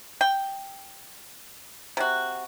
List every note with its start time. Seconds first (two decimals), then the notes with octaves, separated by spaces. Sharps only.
0.21 G5
1.97 C3 F#4